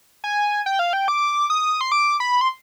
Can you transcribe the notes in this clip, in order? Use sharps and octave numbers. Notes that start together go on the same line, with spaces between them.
G#5
G5
F5
G5
D6
D#6
C6
D6
B5
C6